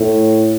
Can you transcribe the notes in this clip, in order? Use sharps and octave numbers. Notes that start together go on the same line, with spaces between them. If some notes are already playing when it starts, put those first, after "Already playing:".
Already playing: A2